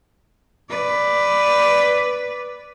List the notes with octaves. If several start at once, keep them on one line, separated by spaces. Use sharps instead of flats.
B4 D5